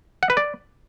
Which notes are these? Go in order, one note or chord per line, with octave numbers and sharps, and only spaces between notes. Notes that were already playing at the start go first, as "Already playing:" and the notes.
F#5
B4
D5